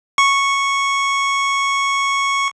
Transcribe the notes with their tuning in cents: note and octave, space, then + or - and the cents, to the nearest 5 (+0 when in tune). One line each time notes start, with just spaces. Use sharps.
C#6 -5